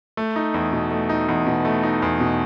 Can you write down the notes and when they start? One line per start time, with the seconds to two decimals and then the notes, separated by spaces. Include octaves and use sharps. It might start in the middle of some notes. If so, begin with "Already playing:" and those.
0.17 A3
0.36 D#4
0.54 E2
0.72 B2
0.91 A3
1.09 D#4
1.29 E2
1.46 B2
1.65 A3
1.83 D#4
2.02 E2
2.20 B2